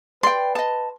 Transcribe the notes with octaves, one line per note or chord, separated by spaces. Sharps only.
B4 D5 G5 C6
D#5 A5